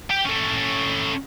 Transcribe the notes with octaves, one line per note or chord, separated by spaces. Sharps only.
G4 G5
C#4 A4